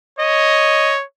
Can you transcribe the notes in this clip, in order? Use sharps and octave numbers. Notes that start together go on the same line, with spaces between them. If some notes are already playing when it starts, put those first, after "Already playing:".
C#5 D#5